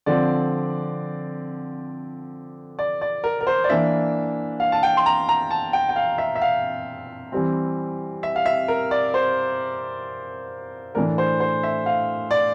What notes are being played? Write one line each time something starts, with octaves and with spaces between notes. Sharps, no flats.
D3 F3 C4 D5
D5
D5
A#4
A#4
C5
D5
E3 A#3 D4 E5
F5
A5
G5
C6
A#5
A#5
A5
G5
G5
F5
E5
E5
F5
E3 G3 C4
E5
F5
E5
A#4
D5
C5
A2 E3 A3 D4 A#4
C5
C5
E5
F5
D5